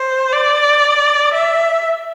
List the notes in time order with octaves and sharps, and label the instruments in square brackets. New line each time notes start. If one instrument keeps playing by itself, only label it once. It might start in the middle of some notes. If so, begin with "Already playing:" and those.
Already playing: [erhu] C5
D5
E5